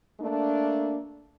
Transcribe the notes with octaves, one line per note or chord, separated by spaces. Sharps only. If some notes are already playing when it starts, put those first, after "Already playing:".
A3 A#3 D4